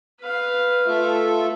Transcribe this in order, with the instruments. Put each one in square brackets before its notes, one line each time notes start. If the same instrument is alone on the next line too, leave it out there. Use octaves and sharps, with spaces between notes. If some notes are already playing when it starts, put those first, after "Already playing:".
[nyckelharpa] B4 F5
[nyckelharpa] A3 [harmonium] F4 A4 E5